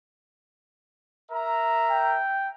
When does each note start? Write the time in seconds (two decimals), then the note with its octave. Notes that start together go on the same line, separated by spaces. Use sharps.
1.31 A#4 E5 A#5
1.91 G5